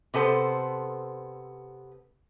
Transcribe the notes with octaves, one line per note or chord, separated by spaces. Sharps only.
C3 B3 A4 C5